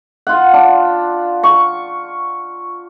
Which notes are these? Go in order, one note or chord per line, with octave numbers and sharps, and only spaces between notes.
F4 F#5
D4
C#6